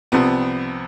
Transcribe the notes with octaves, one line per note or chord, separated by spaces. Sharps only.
C2 C3 F3 B3